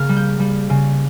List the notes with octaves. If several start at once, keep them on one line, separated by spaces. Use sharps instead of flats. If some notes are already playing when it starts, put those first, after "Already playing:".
Already playing: C#3 A#3 F6
G3
G6
G3
C#3